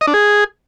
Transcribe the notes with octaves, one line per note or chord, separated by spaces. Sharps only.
D#5
D4
G#4